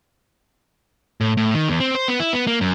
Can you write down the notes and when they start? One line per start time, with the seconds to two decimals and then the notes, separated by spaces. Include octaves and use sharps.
1.21 A2
1.37 A2
1.55 D#3
1.68 E2
1.80 C4
1.95 C5
2.08 B3
2.20 E4
2.33 B3
2.47 A#3
2.61 F#2